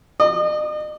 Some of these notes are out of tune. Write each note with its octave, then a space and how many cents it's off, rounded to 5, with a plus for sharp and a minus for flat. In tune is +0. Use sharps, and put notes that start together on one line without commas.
D#5 -40